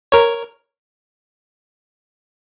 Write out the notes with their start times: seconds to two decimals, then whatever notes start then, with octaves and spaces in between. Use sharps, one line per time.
0.12 A#4 C#5